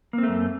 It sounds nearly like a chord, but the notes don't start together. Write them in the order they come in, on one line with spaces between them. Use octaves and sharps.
A#3 C4 A3 F#2